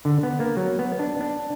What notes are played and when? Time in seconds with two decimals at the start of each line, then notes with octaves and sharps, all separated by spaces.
0.05 D3
0.23 B3
0.40 A#3
0.57 F#3
0.79 B3
0.99 D4
1.21 D4